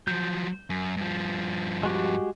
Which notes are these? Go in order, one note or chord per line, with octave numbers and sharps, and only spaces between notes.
F3 F#3 G6
F#2
G2 F3
G#3 F#4 G4